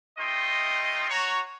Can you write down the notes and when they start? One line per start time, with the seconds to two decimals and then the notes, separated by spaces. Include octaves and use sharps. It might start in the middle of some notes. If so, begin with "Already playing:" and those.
0.18 A3 D#4 F4 D#5 G5 C6
1.10 F#4 C#5 A#5